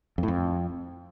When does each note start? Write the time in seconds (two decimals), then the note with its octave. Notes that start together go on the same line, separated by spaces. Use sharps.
0.18 F2
0.23 A2
0.28 F2